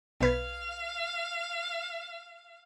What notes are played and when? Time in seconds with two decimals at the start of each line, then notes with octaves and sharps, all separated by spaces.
0.21 B1 B4 F5 G#6